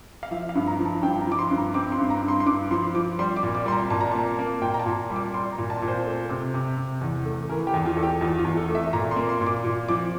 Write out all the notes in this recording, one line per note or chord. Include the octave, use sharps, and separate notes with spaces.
F5
F3 E5
F5
G2
A#5
F3
A5
G2 G5
A#5
F3 D6
C6
G2
A#5
C4 D6
C6
G2
A#5
G2
C6
C6
G2 D6
F3 C6
F3 D6
G3 C6
D6
A#2
D6
G3 C6
A#5
A#2 A5
A#5
A#3 A5
A#3
A#2 G5
A#5
A5
A#2
G3
D6
G3 C6
A#5
A#2
A5
A#2
C5
A3
C3
C3
C3
E2
A3
E3 A#4
G4
E2
F4
E2 A4
G4
E2 F4
F4
E2
A4
A3
E5
A#2 A#5
C6
A#3
C6
A#2
D6
A#2
F3 D6